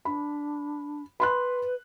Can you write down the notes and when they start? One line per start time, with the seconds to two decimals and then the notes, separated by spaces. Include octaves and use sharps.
0.05 D4 B5
1.20 B4 B5 C6 F#6